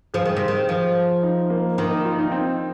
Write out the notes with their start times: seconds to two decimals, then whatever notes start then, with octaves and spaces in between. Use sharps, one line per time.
0.14 F3 G#4
0.25 D#3
0.37 C3
0.48 D#3
0.69 F3
1.23 D#4
1.50 A#3
1.78 D#3 A#3
1.91 D#4
2.05 F4
2.18 D#4
2.32 C4